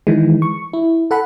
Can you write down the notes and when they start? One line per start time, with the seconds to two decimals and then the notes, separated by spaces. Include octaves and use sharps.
0.07 D#3 E3 G#3
0.42 C#6
0.73 E4
1.11 A4 F#5 B5